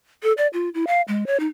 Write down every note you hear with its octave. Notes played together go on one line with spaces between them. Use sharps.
A4
D5
F4
E4
F5
G#3
C#5
D#4